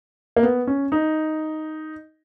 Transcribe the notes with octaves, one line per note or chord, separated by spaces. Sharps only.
A#3
B3
C#4
D#4